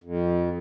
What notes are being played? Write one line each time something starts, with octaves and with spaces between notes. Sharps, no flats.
F2